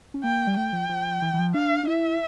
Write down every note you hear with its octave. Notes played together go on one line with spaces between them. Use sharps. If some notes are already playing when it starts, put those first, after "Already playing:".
C#4
A#3 G5
G3
A3 G5
F3
F3
E3
E3
F3
D4 F5
D4
E4 E5